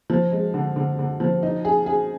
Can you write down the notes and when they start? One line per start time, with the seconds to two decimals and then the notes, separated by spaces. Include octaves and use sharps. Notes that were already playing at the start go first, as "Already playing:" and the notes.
0.10 F3
0.32 G#3
0.54 D3
0.76 D3
0.99 D3
1.20 F3
1.43 D#4
1.65 G#4
1.86 G#4